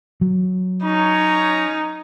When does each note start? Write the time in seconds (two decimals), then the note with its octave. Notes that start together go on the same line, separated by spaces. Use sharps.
0.21 F#3
0.83 C#4 D#4 C#5 A#5